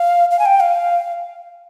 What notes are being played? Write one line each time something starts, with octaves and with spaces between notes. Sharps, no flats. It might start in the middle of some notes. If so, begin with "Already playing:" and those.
Already playing: F5
F5
G#5
G5
F5